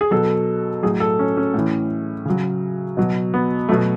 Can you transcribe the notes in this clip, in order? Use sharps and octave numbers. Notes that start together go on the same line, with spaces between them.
G#4
B2 F#3 A4
A2 F#3 G#4
A4
C#4
C#4
A2 E3
C#3 F#3
B2 F#3
B3
B2 F#3 A3